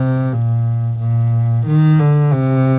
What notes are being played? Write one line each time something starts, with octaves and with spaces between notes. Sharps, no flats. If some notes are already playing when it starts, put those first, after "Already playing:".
Already playing: C3
A#2
A#2
D#3
D3
C3